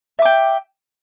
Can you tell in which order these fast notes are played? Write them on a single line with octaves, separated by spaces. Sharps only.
E5 D6 G5